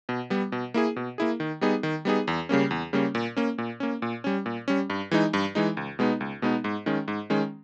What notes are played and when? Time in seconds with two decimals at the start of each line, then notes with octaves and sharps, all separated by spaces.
0.09 B2
0.30 G3 B3
0.52 B2
0.74 A#3 E4 G#4
0.96 B2
1.18 A#3 E4 G#4
1.40 D#3
1.61 G3 B3 D#4 G#4
1.83 D#3
2.05 G3 B3 D#4 G#4
2.28 E2
2.49 C#3 G3 A#3 C#4
2.71 E2
2.93 C#3 G3 A#3 C#4
3.15 A#2
3.36 A#3 C#4
3.58 A#2
3.80 A#3 C#4
4.02 A#2
4.24 G3 C#4
4.46 A#2
4.68 G3 C#4
4.90 G2
5.11 E3 G#3 D#4
5.33 G2
5.55 E3 G#3 D#4
5.77 C#2
5.99 B2 G#3 B3 D#4
6.21 C#2
6.42 B2 G#3 B3 D#4
6.64 G#2
6.86 D#3 G#3 C#4
7.08 G#2
7.30 D#3 G#3 C#4